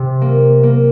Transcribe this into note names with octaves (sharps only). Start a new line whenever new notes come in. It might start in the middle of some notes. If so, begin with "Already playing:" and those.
Already playing: C3
A#3
A#3